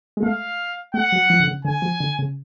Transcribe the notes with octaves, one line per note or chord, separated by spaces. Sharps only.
G#3
A3 F5
A3 F#5
F#3
F3
D3
C#3
D3 G#5
F3
D3
C#3